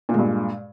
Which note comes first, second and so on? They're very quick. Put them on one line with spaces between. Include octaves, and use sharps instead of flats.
A#2 G#3 G2